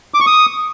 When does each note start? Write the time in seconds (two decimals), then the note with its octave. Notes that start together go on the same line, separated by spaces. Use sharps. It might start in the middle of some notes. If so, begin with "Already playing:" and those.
0.14 D6
0.20 C#6
0.26 D#6